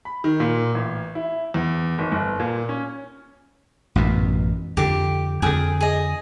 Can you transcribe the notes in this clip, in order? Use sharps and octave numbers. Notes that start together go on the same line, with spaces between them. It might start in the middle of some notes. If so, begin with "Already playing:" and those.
B5
D#3
A#2
A1
E4
E2
G#1
G1
A#2
C#4
A1 F#2 B2
F2 D3 G4
F2 D3 G#4 G5 D#6
G#4 D#5